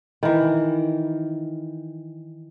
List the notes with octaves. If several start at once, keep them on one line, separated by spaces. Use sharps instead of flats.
D#3 E3